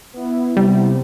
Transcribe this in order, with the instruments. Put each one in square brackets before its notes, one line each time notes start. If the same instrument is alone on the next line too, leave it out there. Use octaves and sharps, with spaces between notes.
[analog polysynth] B3 E4
[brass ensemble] C3 [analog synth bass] G3